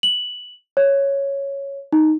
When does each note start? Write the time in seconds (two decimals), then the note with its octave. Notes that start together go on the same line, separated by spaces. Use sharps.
0.03 F#7
0.77 C#5
1.93 D#4